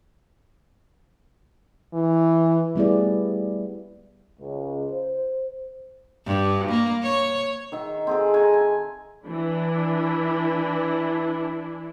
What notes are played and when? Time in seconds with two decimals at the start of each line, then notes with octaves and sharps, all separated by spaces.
1.93 E3
2.76 G3 A3 B3 E4 G#4 D5
4.39 C#2
4.92 C5
6.26 G2
6.70 A#3
7.03 C#5
7.72 D#3 E5
8.07 C4 G#4 A4
8.34 G#5 A#5 C#6
8.54 G#5
9.27 E3 D4 E4